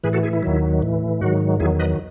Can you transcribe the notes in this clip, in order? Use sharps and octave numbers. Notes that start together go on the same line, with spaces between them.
A2 E3 G#4 B4
F#4 A4
E4 G#4
E4
D#2 D#3 F#3
A2 E3
G#2 D#3 F#3 F#4
E2 D#3 F#3 E4 G#4
B4 D#5